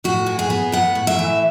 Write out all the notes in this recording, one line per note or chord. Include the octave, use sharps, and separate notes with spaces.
A2 F#4
E3
G#4
B3
A2 F#5
A2
E5
E3